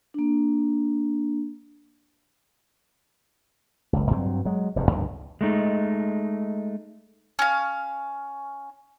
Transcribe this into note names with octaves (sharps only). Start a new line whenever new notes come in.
A#3 D4
F#1 C#2
G2 F#3 C4
F#3 G#3
F1 E2 G2
C#2 G2 D3 D#3
G#3 A3 D#4
C#4 F5